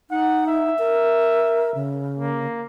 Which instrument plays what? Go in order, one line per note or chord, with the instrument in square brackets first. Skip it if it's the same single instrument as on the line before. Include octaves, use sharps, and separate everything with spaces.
[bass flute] D#4 [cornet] F#5
[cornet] E5
[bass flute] A#4
C#3
[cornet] A#3